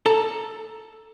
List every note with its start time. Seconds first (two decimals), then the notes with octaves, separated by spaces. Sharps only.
0.06 A4 A5 A#5